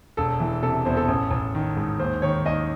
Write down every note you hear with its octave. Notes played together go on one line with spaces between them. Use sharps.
E1 A4
E3
C3 A4
E2 C5
A4
A1
A1
D#3
G#2
D#2 C5
D#3 C#5
D#2 D#5